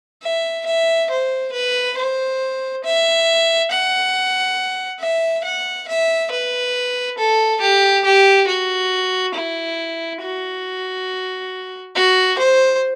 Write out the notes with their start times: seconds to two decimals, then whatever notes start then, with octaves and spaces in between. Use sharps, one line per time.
0.23 E5
0.66 E5
1.10 C5
1.53 B4
1.97 C5
2.84 E5
3.71 F#5
5.00 E5
5.44 F#5
5.88 E5
6.31 B4
7.18 A4
7.61 G4
8.05 G4
8.48 F#4
9.35 E4
10.22 F#4
11.95 F#4
12.38 C5